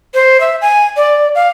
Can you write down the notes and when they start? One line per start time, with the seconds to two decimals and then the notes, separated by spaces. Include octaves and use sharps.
0.14 C5
0.40 E5
0.61 G#5
0.97 D5
1.35 F5